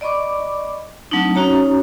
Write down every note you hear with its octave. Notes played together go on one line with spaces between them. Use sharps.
D5 D#5 B5 C#6 D6
F#3 A3 C4 D4 D#4
C#4 D#4 F#4 C#5 A#5